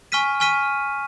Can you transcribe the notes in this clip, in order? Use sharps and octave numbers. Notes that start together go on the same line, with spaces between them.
G#5 C#6 F6 B6 D#7
G#5 C#6 F6 B6 D#7